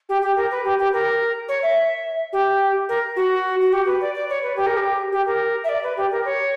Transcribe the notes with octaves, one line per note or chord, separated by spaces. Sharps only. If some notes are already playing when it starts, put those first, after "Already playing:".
G4
G4
A#4
B4
G4
G4
A#4
C#5
E5
G4
A#4
F#4
F#4
G4
B4
D5
D5
C#5
B4
G4
A#4
G4
G4
A#4
E5
D5
B4
G4
A#4
C#5